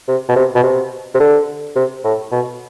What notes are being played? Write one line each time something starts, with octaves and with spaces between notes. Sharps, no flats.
C3
B2
C3
B2
C3
C3
D3
C3
A2
B2